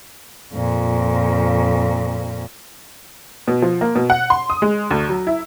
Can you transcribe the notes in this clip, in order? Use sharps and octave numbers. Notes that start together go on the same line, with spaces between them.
F2 A#2
B2
F3
A#3
B2
F#5
C6
D#6
G#3
D2
F#3
E4